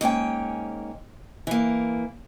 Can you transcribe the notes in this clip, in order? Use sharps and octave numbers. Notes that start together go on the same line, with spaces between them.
G#2 A#3 C#4 G5
E3 A#3